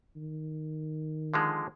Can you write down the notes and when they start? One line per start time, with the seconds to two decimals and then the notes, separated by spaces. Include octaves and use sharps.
0.17 D#3
1.34 D3 F3 G#3